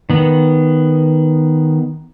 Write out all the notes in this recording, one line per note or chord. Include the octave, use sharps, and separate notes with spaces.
D#3 B3